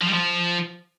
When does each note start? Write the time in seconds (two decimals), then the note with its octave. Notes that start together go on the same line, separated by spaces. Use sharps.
0.02 F3
0.07 G3
0.12 F3